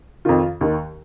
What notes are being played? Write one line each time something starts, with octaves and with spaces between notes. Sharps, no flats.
F2 D#3 F4
D#2 D#3